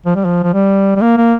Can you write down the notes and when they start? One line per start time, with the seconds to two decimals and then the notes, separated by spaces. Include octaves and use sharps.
0.06 F3
0.15 G3
0.25 F3
0.44 F3
0.54 G3
0.96 G3
1.02 A#3
1.17 A#3